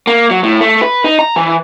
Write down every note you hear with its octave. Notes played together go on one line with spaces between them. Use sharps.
A#3
F#3
A2
A3
B4
D#4
A#5
E3